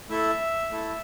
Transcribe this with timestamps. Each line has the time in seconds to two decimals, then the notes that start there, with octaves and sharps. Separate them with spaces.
0.09 A3 E4 A4 E5
0.71 A3 E4 A4